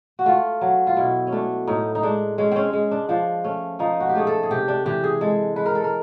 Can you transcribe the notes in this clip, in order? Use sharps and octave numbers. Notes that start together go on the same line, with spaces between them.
F#4
A3 F4
F#3
F4
B2 E4
C#4
A3 D4
A2 D#4
D#4
G#3 D4
G#3 C#4
C4 C#4
G#3
D4
F3 D4
A3 C#4
F3 D#4
F#4
G4
A3 G#4
A4
G#4
C3 G4
D4
E3 G4
G#4
G#3 A4
G#3 B4
A#4
A4
A#4